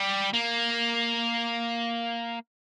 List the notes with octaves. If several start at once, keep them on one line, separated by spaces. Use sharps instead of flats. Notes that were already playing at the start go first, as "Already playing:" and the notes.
Already playing: G3
A#3